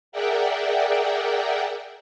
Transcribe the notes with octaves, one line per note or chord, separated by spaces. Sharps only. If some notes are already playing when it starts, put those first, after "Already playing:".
G#4 A#4 D5 E5 F#5 G5